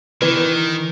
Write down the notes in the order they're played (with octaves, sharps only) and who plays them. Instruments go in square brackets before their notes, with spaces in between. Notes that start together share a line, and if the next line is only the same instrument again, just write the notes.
[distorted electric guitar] D#3 [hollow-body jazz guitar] E3 B4